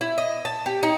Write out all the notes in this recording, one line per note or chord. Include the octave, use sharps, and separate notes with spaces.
E4
D#5
A5
G4
D#4